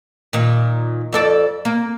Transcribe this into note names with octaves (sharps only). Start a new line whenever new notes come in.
A#2 D#3
F2 A4 D5
A#3